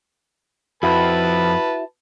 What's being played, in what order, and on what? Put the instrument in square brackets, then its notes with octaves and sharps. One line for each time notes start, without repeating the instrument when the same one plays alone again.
[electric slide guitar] F2 [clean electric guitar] E4 F#4 [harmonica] B4 A5 B5